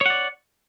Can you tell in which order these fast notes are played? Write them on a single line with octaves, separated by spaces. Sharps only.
C#5 F#5 D5